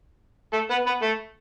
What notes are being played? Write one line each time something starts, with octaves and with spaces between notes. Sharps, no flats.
A3 A4
B3 B4
B3 B4
A3 A4